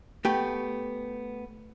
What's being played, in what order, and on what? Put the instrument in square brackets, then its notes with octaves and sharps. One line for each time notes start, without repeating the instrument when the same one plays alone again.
[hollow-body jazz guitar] A3 B3 G4 G5